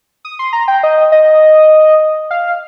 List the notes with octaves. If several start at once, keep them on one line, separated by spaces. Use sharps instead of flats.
D#6
C6
A#5
G5
D#5
D#5
F5